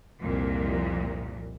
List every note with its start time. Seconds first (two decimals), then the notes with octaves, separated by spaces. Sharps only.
0.20 C2 F2 A#2